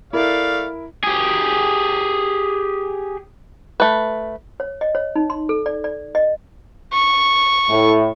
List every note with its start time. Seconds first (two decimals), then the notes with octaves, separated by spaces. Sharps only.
0.13 A3 E4 A#4 D5 F5
1.04 G4 G#4
3.80 A3 B4
4.60 C#5
4.81 D#5
4.95 C#5
5.15 D#4
5.30 C6
5.49 A4
5.66 D5
5.84 D5
6.15 D#5
6.93 C#6
7.69 A2